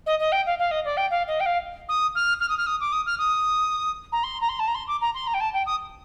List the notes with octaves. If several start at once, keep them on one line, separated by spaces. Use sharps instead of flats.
D#5
D#5
G5
F5
F5
D#5
D5
G5
F5
D#5
G5
F5
D#6
F6
F6
D#6
F6
D#6
D6
D#6
F6
D#6
A#5
C6
A#5
C6
A5
A#5
C6
D6
A#5
C6
A#5
G5
A5
G5
D#6